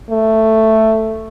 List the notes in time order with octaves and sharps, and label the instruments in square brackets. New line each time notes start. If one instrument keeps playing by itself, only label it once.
[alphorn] A3